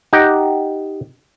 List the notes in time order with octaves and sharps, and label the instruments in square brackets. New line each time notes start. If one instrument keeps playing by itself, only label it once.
[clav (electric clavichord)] D#4 G4 D#5 F#5 G5